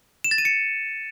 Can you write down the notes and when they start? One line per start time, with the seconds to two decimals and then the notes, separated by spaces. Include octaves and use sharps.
0.24 E7
0.31 A6
0.38 D#7
0.45 C#7